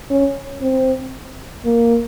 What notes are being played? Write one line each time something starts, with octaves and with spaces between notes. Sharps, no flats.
C#4
C4
A#3